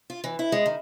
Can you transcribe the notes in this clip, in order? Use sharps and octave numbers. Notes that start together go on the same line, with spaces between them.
F4
E3
E4
G#3
D#3